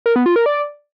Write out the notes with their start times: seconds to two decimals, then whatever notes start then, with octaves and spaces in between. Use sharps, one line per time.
0.06 A#4
0.16 B3
0.26 F4
0.36 A#4
0.46 D5